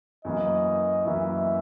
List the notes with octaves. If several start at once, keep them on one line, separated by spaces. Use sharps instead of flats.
F#2 E3 A#3 D#5
F#2 E3 A#3 E5